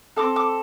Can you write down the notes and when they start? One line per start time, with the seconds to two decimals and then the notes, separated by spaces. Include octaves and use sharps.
0.16 C4 F4 A4 D6
0.36 D6